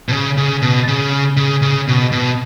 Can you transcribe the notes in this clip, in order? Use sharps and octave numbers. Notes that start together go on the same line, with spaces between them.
B2
C#3
C#3
B2
C#3
C#3
C#3
B2
B2